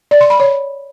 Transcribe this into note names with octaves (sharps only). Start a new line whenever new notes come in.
D5
C6
B5
C#5